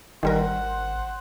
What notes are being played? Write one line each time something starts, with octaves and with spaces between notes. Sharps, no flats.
G#1 D#3 G3 A#4 C5 F#5